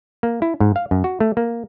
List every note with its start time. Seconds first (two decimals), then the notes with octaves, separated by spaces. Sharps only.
0.23 A#3
0.42 E4
0.60 G#2
0.76 F5
0.91 F#2
1.04 F#4
1.20 A3
1.37 A#3